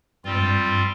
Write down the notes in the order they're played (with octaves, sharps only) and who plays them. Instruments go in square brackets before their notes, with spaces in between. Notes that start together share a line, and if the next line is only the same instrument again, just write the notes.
[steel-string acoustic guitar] G2 [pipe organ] G3 C4 F4
[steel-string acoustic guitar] G#2
G2
G2